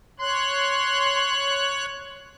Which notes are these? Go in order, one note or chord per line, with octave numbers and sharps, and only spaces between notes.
C#5 C6 F#6